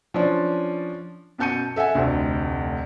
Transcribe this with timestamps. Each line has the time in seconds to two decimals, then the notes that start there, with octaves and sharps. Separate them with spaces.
0.14 F3 C#4 D4
1.38 F#2 B2 A5 G6 C#7 D#7
1.76 A4 E5 F#5 G#5
1.95 F1 D2